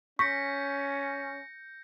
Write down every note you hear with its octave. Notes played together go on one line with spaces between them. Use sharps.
C#4 C#6 G6 A#6 B6 C#7